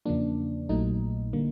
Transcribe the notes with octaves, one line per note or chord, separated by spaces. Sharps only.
E2 C#3 F3 A#3 D4
A#1 A#2 F#3 A3 D#4
D3 G3 A#3